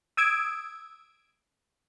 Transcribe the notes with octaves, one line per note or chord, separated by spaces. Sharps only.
D#6 E6 G#6 D7